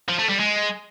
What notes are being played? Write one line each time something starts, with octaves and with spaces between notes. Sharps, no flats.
F3
A3
G3
G#3